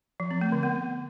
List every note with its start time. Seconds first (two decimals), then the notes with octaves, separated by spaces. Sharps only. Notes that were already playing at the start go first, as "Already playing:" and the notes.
0.20 F3
0.31 C4
0.41 A3
0.52 D3
0.63 B3